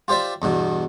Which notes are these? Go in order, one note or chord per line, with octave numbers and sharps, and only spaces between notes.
F4 G4 C5 D5 E5
E2 G2 B2